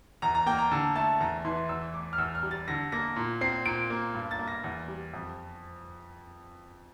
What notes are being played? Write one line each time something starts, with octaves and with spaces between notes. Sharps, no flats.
E2 A#5
A#5
A#3 G5
A#5
D3 A5
A3 A5
E2 A#5
E3 C6
E2 E6
A3 D6
F6
E2 E6
F6
G3
A6
D3 A#6
A#3 A#6
A#2
C4 C7
A#2 D7
A#3
G2
A6
A#3
A#6
E2
G3
F2